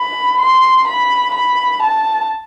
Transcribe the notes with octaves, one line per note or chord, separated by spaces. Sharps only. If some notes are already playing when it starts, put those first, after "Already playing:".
Already playing: B5
C6
B5
B5
A5